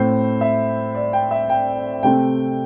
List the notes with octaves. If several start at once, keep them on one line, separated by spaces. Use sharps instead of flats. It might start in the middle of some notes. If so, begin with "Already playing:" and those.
Already playing: A2 A3 C4 C5
E5
D5
G5
E5
G5
C3 A3 C4 G5